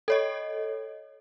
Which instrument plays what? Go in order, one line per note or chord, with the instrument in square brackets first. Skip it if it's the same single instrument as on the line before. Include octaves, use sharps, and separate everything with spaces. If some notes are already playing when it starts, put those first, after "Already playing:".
[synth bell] A4 C#5 D#5